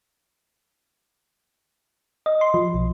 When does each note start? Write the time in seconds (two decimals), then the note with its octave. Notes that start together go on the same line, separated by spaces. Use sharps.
2.26 D#5
2.41 C6
2.54 F3
2.74 B1